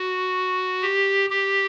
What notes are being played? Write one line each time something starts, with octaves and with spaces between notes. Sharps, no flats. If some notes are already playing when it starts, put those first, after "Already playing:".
Already playing: F#4
G4
G4